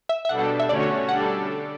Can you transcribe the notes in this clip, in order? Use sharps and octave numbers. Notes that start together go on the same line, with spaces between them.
E5
E5
B2 G3 D4 A4 F#5
F#5
E5
D3 A3 C#4 F#4 C#5 D5
G3 D4 A4 D5 F#5